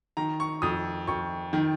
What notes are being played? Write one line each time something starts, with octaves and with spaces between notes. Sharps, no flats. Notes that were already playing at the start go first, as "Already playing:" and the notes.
D#3 A#5
C#6
F2 D#6
F2 C#6
D#3